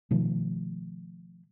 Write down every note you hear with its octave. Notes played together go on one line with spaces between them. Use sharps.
B2 D#3 F3 A3